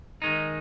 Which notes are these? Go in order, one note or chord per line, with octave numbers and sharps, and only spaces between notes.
D#3 G#3 D#4